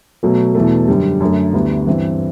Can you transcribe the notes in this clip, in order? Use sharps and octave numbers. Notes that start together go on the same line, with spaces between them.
B2 F#3 A3
E2 B2 A3
F#2 D3 G3
F#2 D3 A3
D2 D3 G3 B3 E4
G2 E3 G3 C4